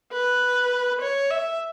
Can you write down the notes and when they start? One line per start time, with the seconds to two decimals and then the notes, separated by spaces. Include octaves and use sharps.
0.13 B4
1.01 C#5
1.31 E5